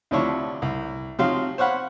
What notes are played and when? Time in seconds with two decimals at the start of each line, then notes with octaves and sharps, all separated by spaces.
0.11 D2 C3 F3 D4 E4 C#5
0.62 C2
1.19 C3 F3 F#3 D#4 F5 C6
1.58 C5 C#5 F5 F#5 B5